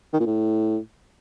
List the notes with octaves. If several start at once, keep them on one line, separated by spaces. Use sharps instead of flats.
D#3
A#2
A2